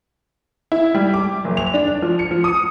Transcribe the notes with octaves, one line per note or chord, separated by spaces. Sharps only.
E4
G3
D6
F#1
F7
D4
F3
C#7
F3
D#6